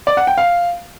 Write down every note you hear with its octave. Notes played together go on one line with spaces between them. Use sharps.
D5
F#5
G5
F5